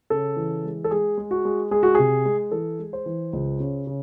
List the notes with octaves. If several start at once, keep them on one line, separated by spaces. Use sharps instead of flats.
C#3 A4
E3
G#3
A4
G#3 G#4
G#3
F#4
G#3
G#3 G#4
F#4
C3 G#4
G#3
E3 A4
G#3
C5
E3
C#2
C#3
C#3